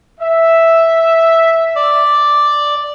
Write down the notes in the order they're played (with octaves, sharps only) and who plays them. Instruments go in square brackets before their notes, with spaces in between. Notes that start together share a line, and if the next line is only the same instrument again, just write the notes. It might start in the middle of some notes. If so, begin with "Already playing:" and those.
[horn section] E5
[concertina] D5